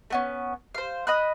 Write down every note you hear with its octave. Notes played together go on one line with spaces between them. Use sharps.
A3 B3 C#4
C5 F5
D#5 B5 F#6